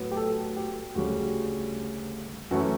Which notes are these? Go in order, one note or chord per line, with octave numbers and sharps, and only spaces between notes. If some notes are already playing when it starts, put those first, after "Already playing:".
Already playing: A2 F#3 B3
G4
A4
G4
D2 C#3 G3 C#4 F#4
F#2 E3 A3 C#4 F#4